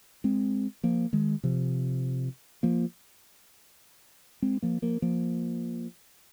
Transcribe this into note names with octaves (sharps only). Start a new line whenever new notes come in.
G#3 C4
F3 A#3
D#3 G#3
C3 F3
F3 A#3
G#3 C4
F3 A#3
F3 A#3
F3 A#3